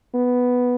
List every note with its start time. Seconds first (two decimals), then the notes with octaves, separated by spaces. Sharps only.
0.14 B3